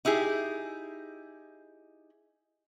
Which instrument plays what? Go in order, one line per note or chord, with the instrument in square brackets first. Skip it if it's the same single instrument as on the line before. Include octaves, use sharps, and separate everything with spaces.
[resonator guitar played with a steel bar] D#4 E4 G4 G#4